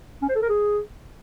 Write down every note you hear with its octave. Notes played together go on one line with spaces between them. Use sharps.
C#4
C5
A4
A#4
G#4